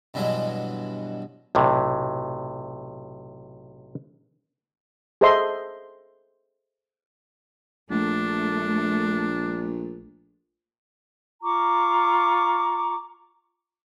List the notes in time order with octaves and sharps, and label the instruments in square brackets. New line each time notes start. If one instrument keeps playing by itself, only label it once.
[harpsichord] G2 B2 E3 F#3 G#3
[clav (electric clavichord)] B1 A2 C3
[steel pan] G#4 A4 C5 D#5 E5 C6
[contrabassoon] A#1 [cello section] A3 [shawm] D4
[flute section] F4 A#5 C#6 D6